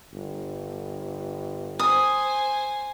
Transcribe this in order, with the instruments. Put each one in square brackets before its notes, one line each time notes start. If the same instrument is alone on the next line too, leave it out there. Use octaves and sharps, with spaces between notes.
[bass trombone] G1
[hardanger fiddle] C5 G#5 [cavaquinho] D#6